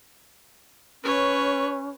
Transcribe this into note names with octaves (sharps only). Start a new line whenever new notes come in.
C#4 B4 C#5